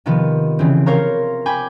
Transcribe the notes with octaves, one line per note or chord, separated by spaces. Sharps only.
C3 D#3 F3 B3
C#3 E3 C4
A#4 C5 C#5 F5 A#5
G5 G#5 B5 D6